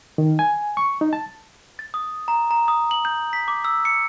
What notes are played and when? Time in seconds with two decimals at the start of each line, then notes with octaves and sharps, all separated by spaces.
0.18 D#3
0.39 G#5
0.77 C#6
1.01 D#4
1.13 A5
1.79 A6
1.94 D#6
2.28 A#5
2.51 A#5
2.68 D#6
2.91 F#7
3.05 G6
3.33 B6
3.48 D6
3.65 E6
3.85 C#7